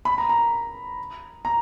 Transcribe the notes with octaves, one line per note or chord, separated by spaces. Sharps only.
B5
A#5
A#5
A#5